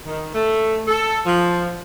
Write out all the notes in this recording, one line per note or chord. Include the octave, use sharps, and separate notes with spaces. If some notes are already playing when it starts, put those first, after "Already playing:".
D#3
A3
A4
F3